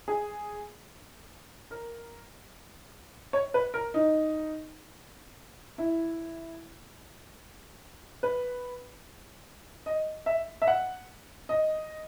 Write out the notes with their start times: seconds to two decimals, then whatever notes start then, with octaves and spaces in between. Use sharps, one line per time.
0.08 G#4
1.71 A#4
3.33 C#5
3.54 B4
3.74 A#4
3.94 D#4
5.78 E4
8.23 B4
9.86 D#5
10.26 E5
10.62 E5
10.67 F#5
11.49 D#5